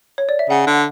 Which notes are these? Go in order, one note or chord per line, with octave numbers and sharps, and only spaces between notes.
C#5
D5
E5
C#3 F#5
D3